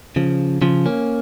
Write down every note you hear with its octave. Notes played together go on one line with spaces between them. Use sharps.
C#3 F3
C#3 F3
A#3 C#4